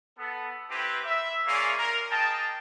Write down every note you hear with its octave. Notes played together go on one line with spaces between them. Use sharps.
B3 A4
C4 E4 G4 B4
E5
A#3 C#4 F4 G#4 D5 F5
A#4
G#4 A#4 D#5 G5 A5